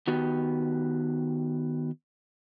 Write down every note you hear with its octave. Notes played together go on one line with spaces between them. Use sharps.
D#3 B3 F#4 G4